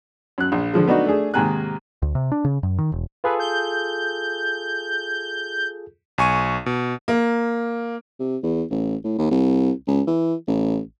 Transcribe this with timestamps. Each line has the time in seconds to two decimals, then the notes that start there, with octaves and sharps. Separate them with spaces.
0.38 F#2 F#6
0.52 A#1
0.74 D3 F3 G#3
0.86 A3 B3 D4 D#4 F#4
1.06 A3 D4 G#4
1.34 G#2 C3 D#3 A#3 G#5 F#6
2.02 D2
2.15 C3
2.32 D4
2.45 C#3
2.63 F#2
2.78 D#3
2.92 E1
3.24 F4 G#4 A4 B4
3.40 G6
6.18 B1 G#5 C#6 D#7
6.66 B2
7.08 A#3
8.19 C3
8.43 E2
8.70 A1
9.04 A2
9.18 D#2
9.31 C2
9.87 C#2
10.07 E3
10.47 A1